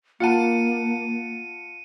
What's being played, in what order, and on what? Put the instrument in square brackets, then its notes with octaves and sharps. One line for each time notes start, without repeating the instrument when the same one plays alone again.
[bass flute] A#3 [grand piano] F4 F#5 A5 [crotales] C#7 D#7